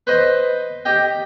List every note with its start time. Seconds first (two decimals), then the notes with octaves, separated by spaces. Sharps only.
0.07 B4 C5 D#5
0.85 G4 D#5 G5